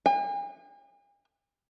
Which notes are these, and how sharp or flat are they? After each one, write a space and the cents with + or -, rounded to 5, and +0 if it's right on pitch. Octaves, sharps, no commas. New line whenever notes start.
G#5 -45